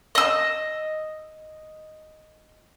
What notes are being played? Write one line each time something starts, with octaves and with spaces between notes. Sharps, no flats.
D#5 E6